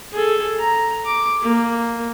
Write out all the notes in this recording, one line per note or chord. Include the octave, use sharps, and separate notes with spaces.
G#4 A4
A#5
D6
A#3